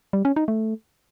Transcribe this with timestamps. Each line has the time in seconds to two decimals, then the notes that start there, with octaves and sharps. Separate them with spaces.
0.13 G3
0.25 C#4
0.36 D#4
0.48 A3